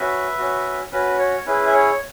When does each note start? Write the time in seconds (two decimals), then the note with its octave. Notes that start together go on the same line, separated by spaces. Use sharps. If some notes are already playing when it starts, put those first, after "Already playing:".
Already playing: C#4 F#4 B4 E5
0.38 C#4 F#4
0.92 C#4 F#4 B4
1.18 C#5
1.46 C#4 E4 G#4 B4
1.66 E5
1.73 C#5